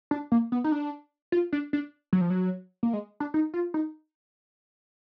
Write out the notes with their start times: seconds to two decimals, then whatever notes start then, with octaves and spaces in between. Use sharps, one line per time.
0.11 D4
0.32 A#3
0.52 B3
0.64 D#4
0.72 D4
1.32 F4
1.53 D4
1.73 D4
2.13 F#3
2.21 F3
2.30 F#3
2.83 A#3
2.93 G#3
3.20 D4
3.34 D#4
3.54 F4
3.74 D#4